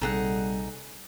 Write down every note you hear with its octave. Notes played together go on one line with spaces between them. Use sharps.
A#1 C3 G3 D#4 G#4 A4 F#5